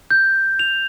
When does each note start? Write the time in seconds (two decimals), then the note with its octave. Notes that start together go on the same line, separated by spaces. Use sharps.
0.11 G6
0.59 F7